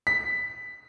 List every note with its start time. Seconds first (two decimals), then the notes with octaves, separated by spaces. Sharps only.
0.07 B6